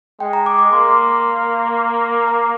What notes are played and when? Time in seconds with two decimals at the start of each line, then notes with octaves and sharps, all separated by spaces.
0.20 G#3 G5
0.33 A#5
0.46 D6
0.59 D6
0.72 A#3 C6
2.27 A#5